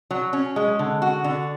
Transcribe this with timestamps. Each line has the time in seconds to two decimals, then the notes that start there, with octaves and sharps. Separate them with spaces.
0.11 F#3
0.33 C#4
0.56 G#3
0.79 D3
1.02 F#4
1.24 D3